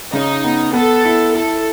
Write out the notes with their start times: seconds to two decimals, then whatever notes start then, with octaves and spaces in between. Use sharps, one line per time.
0.13 C#3 D#4
0.44 B3
0.73 B3 A4
1.05 E4
1.34 E4 A4